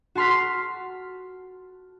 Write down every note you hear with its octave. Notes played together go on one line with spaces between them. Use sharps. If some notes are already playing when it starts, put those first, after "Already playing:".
F#4 A5 C6 F6 B6